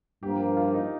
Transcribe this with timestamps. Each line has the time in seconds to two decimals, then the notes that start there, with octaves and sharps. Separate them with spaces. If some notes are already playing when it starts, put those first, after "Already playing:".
0.23 G2 F3 A#3 G4
0.57 F4
0.74 D#4